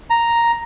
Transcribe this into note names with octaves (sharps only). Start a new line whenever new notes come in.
A#5